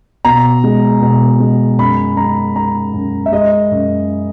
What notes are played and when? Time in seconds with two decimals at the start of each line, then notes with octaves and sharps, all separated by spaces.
0.25 B2 A#5
0.64 G#3
1.02 B2
1.40 G#3
1.78 F#2 B5
2.17 G#3 A#5
2.56 G#3 A#5
2.93 F#2
3.26 E5
3.32 G#3 D#5
3.71 F#2